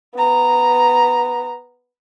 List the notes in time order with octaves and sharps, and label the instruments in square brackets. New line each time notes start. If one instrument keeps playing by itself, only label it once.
[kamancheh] B3 A#5